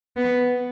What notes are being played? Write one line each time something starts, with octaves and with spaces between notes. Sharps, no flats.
B3